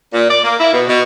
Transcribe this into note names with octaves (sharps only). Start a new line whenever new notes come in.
A#2
D5
A#3
E4
B2
B2